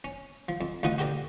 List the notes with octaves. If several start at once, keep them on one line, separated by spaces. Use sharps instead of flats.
C#4
F3
F2
D2 F3 D#4 F#4 F#5 D#6
F#4 G4 A4 A#4 D5